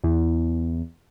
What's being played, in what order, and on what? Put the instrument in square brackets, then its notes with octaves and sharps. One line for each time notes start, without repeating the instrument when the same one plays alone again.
[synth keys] E2